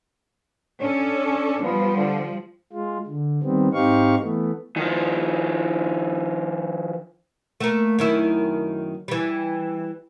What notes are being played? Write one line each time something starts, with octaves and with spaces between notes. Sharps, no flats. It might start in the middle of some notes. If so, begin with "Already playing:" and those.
C#4 D4 A4
F3 G3 B3
D3
G#3 F4
D3
D#3 G3 B3 C4
G#2 C4 D#4 G4 F5 C#6
E3 A3 B3
D#3 F3
A3 A#3
F#2 D#3 E4
E3 G3